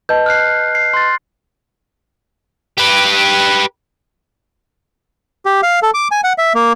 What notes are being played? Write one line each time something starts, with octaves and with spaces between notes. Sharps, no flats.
B4 D#5 A5 G6
F6 F#6 C7
C7
C6 A6
G4 B4
G4
F5
A4
D6
G#5
F#5
E5
A#3